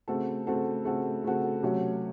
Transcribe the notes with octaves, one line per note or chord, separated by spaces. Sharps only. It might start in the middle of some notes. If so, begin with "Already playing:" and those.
C#3 A3 C4 F#4 A4
C#3 A3 C4 F#4 A4
C#3 A3 C4 F#4 A4
C#3 A3 C4 F#4 A4
C3 F#3 A3 C#4 F#4